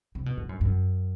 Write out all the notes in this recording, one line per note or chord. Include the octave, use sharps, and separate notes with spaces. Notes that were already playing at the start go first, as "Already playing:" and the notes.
C3
B2
A2
F#2
F#2